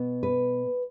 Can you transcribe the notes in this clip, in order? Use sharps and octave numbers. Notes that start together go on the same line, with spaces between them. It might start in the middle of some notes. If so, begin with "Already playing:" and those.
Already playing: B2 B3
B4